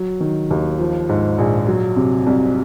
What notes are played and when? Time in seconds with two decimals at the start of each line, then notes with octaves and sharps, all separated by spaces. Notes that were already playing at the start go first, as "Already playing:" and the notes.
Already playing: F#3
0.20 D#3
0.50 D#2
0.79 F3
1.09 G#2
1.38 A#1
1.67 F#3
1.97 C3
2.27 C2